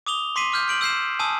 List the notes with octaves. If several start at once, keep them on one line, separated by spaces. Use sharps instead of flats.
D6 D#6 F7 G7
C6 D6 B6 C7 D#7
D6 F6 G6
G6 D7 F#7
E6 G6 C7 E7
G#5 A5 D#6 E6